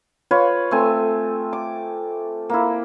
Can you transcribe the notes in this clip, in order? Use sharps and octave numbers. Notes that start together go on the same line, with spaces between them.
F4 B4 C#5
A3 C4 G#5
D6
A#3 E4